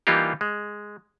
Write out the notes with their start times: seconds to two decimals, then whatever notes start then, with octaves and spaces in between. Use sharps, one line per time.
0.07 E3 G3 A#3 D#4 F4 G4
0.41 G#3